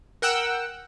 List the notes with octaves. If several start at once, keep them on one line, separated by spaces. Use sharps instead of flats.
A#4 F#5 G5 E6